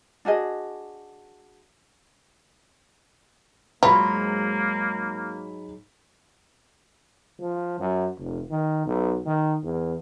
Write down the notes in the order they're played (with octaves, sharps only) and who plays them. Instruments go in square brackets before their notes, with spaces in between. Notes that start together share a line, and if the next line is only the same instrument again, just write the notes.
[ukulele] D4 F#4 G#4 D#5
[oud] G#2 F#3 G#3 [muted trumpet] A#3 [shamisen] F4 [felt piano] A#5 B5
[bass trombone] F3
F#2
F1
D#3
B1
D#3
E2